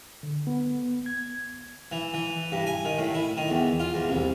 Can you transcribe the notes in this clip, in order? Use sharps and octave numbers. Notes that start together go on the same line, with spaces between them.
D3
B3
G#6
E3
E3
G2
G#5
D#3
A2
E4
D#3
E2
F4
E2
C2